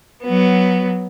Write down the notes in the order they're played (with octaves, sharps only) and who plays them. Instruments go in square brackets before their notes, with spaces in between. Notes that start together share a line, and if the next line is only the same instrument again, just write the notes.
[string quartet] F#3 B3